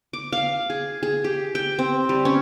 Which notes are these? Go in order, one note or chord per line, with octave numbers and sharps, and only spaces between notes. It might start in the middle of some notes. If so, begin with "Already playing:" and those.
D6
F5
G#4
G#4
G4
G5
C4
G3
C#4